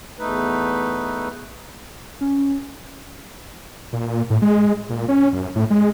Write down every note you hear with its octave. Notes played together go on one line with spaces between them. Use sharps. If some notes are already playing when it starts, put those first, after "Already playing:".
E2 A3 D#4 B4
C#4
A#2
A2
G#3
A#2
C#4
F#2
A2
G#3